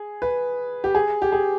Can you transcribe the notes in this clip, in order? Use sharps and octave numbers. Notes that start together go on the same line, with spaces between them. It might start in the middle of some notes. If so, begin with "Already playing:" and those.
Already playing: G#4
B4
G4
G#4
G4
G#4